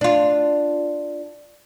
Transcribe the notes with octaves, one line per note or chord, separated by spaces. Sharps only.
D4 F4